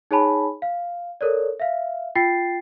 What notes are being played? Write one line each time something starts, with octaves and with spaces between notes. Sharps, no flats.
D#4 G#4 C#5 G#5 A5 B5
F5
A4 A#4 C#5 D5
E5 F5
F4 G5 A6 C7